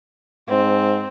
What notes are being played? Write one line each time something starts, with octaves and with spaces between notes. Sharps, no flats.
G#2 C4